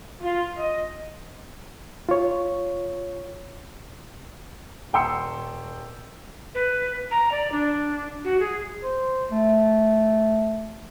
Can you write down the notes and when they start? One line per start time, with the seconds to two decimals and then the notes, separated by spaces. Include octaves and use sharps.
0.21 F4
0.56 D#5
2.09 F4 C#5
4.93 D#1 G5 C6 E6 C#7
6.55 B4
7.11 A#5
7.32 D5
7.52 D4
8.25 F#4
8.40 G#4
8.83 C5
9.31 A3